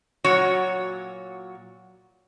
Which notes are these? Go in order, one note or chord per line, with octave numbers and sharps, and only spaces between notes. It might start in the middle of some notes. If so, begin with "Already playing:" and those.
A#2 F#3 F#4 C#5